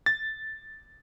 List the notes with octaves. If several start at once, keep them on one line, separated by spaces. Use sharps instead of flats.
A6